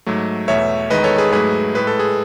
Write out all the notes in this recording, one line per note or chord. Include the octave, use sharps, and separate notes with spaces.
G#2 F#3 A3
E2 B2 A3 C#5 E5
E2 D#3 G#3 B4 D#5
A4 C#5
G#4 B4
G#2 F#3 A3 G#4 B4
A2 G#3 B4
A4
G#4